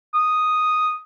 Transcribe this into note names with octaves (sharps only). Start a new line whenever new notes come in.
D#6